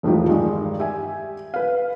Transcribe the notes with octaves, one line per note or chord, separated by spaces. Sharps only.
E1 A2 D#3 F3 G4
G2 D#3 G#3
G4 E5 G#5
B4 F5